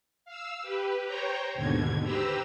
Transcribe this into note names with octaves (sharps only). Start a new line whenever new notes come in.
F5 E6
G4 B4
C5 C#5 G5 A#5
D#2 G#2 B2 D3 G#6
G4 B4 C5 A#5 E6